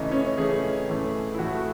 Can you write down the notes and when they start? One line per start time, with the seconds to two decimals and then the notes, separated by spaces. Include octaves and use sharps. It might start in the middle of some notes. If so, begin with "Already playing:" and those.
Already playing: C#3 E3 A3 D#4
0.11 C#4
0.37 C#3 E3 A3 G#4
0.88 A2 E3 A3
1.34 E4
1.38 A2 E3 A3 F#4